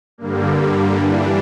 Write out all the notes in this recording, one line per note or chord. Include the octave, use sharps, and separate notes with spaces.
G2 D3 G3 A#3
G2 E3 G3 D4